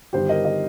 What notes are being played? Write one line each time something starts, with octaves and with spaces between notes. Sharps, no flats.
G1 G2 D#3 G4 C5
A#4 D#5
A#4 D#5